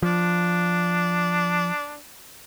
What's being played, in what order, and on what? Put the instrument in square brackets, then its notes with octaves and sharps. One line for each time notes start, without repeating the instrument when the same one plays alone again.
[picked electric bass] F3 [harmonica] D4